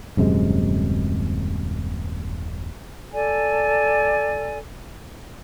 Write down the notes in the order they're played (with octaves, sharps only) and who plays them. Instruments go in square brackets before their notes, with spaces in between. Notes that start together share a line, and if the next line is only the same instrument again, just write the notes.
[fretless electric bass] D#1 F#2 C3 G#3
[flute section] A4 D5 G#5